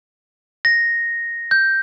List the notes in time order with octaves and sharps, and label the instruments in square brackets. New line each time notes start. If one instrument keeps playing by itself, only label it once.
[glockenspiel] A#6
G6